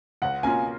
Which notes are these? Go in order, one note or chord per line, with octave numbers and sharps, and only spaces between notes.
C#2 F#5
B2 A#3 C#4 F4 G#5